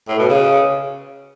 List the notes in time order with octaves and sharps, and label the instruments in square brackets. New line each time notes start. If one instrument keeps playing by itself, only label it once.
[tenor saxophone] A2
B2
C#3